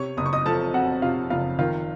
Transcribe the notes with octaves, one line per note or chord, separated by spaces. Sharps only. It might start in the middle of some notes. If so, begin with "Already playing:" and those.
Already playing: C3 C#5 C#6
F#1 D#6
C#6
D#5 D#6
F3 A4 A5
F2 F#4 F#5
C3 F4 F5
F#1 F4 F5
D#3 F4 F5